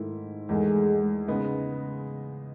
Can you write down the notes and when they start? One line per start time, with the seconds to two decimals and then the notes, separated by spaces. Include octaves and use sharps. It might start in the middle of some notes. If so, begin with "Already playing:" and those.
Already playing: G#2 D#3 A3 E4
0.49 E2 D#3 G#3 A3
1.28 C#3 G#3 B3 D#4